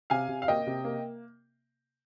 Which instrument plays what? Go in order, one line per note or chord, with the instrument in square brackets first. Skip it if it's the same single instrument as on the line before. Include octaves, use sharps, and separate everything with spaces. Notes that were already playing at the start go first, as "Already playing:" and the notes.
[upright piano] C3 F5 G#5
C3
F5
A#3 D#5 G5
C3
A#3